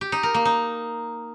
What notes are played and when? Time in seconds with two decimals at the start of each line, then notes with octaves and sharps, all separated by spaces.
0.01 G4
0.12 D#4
0.23 A#4
0.34 A#3
0.45 D#4